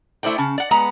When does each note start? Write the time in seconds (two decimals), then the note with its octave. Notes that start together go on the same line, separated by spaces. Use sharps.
0.23 A3 E4 C5 D5 G5
0.38 C#3 C#4 A5
0.58 D5 F#5
0.71 G#3 B3 B4 A#5